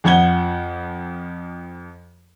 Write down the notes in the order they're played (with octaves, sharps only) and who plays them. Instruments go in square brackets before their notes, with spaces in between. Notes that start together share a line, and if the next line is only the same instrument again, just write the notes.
[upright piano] F2 F3 F#5 G#6 G7